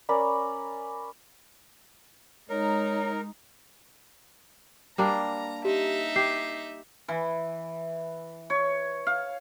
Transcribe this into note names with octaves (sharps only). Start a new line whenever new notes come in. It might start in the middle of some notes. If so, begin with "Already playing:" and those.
C#4 A#4 D5 B5
G#3 D#4 A#4 C#5
G3 A#3 D4 A#5
D#4 G4 E5
G4 C7
E3
C#5
F5